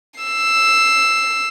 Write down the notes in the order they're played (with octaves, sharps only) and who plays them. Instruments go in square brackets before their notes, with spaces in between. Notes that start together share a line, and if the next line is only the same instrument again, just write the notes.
[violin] E6 C7